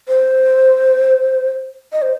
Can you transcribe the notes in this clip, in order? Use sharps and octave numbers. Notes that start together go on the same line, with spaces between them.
C5
D#5
C5